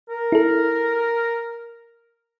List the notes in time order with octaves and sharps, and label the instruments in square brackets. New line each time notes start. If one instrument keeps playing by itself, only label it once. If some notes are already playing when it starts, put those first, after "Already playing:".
[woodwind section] A#4
[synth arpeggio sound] E4 A4